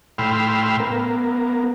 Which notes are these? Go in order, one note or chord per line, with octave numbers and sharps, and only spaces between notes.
A2 G5 B5 C6 E6 F6
B3 A#4